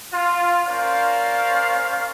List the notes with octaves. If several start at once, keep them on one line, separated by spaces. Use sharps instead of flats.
F4
A#3 C#4 A#4 C5 D5 F5